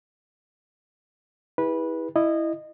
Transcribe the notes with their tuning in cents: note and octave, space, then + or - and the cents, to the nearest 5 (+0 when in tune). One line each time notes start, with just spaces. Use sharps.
E4 -25 G4 +45 B4 -15
E4 +0 D#5 -20